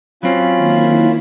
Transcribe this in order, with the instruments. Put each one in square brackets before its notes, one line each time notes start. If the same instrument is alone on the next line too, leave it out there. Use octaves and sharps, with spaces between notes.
[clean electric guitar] F#3 C4 [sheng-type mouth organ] C#4 F4 B5
[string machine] D#3 A#3 E4